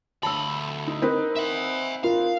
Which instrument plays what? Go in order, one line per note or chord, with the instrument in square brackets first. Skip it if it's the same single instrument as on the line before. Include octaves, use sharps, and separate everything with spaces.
[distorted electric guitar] D2 B5 [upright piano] A5 E6
[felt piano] D#4
[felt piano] C4 D#4 B4 [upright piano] A#4
[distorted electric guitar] E5 F#5
[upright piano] F4 A#4 [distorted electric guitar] F5